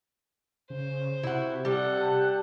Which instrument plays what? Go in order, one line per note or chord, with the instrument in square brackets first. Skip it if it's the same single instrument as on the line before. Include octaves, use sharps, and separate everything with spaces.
[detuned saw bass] C#3 [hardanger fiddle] C5
[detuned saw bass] C3 [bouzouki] E4 F#4
[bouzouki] G3 [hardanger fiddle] A4 F#5
[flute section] G4 A5 F#6